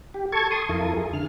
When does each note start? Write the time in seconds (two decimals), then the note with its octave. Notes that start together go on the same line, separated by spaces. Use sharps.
0.14 G4
0.32 A4 A5 C#6 G#6
0.51 C6 D#6
0.69 F2 E4 F4 A4 A#4
0.97 G#4
1.13 D3 F6